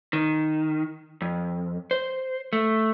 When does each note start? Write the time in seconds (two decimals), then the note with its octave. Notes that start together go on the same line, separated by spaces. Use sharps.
0.13 D#3
1.22 F2
1.91 C5
2.53 A3